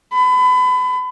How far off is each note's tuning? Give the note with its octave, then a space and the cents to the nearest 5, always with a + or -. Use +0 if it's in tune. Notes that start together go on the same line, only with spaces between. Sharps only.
B5 +30